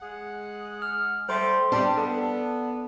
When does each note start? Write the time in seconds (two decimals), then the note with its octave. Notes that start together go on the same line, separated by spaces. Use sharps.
0.01 G#3 G#4 F#5
0.82 F6
1.29 G3 A3 C5 C6
1.72 G3 D4
1.97 B3 A4